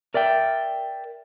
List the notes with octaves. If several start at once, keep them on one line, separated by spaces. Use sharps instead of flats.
A#4 D5 E5 G5